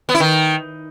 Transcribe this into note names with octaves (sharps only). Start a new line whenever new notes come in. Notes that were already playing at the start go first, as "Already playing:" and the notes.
B3
E4
D#3